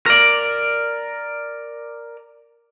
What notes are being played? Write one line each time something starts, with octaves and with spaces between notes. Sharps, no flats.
A#4 D5